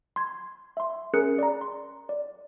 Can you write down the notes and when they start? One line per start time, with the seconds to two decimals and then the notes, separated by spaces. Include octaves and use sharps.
0.16 C6 G#6
0.77 E5 C6
1.13 C#4 G#4 A#4 F#6 C#7
1.39 D5 A#5
1.61 C6
2.09 D5